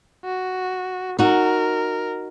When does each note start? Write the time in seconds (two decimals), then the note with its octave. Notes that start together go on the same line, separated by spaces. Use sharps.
0.25 F#4
1.19 D#4 F#4 A#4